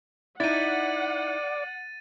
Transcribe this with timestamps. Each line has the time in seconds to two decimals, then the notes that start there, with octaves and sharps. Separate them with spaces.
0.40 D#4 E4 D5 F#5 A6 D#7